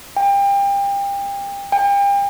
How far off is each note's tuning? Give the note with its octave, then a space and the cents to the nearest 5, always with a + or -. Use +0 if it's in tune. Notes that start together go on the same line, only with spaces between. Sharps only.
G5 +30
G5 +40